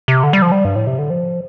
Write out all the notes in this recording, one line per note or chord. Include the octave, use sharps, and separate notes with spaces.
C3
D3
G3
F3
G3
G2
A2
C3
D3
F3